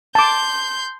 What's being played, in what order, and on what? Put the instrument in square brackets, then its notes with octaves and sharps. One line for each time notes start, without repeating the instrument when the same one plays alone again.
[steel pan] A5 D6 [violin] C6 G6